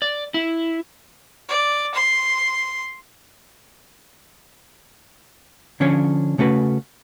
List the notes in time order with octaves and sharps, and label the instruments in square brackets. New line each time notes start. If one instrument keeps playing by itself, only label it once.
[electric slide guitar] D5
E4
[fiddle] D5
C6
[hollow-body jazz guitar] D3 F3 C#4 D4 C#5
C#3 A3 C#4 F#4 B4